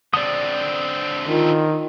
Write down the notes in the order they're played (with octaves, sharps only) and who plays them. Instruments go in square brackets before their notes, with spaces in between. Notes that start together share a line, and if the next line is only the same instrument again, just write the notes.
[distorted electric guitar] D3 C4 [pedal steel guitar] D5 D#6
[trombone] D#3 [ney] F4